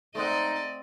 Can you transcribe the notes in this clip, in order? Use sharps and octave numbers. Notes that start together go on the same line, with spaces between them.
G#2 A3 C4 D#4 D5 D#5 F#5